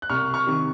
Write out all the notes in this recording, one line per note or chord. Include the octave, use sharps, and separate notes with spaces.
F#6
C2 C#6 F6
C#6 F6
C3 D#3